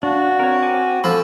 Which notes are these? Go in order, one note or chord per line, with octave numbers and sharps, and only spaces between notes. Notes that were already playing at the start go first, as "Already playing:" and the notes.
D4 F#4 F5
C4 A#4 C#5
G#5 C#6 D6
F3 A4 B5 D6 E6